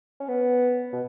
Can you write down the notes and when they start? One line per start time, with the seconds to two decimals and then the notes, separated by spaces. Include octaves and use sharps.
0.20 C#4
0.28 B3
0.93 B2